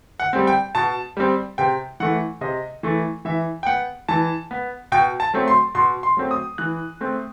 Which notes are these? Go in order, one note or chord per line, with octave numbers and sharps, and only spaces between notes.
F#5
G3 C4
G5
B2 A5
G3 C4
C3 G5
E3 A3 F#5
C3 D#5
E3 A3
E3 E5
G5
B3 F#5
E3 A5
B3
B2 G5
A5
F#3 A3 C4
C6
B2 C6
C6
F#3 A3 C4
D#6
E3 F#6
A3 C4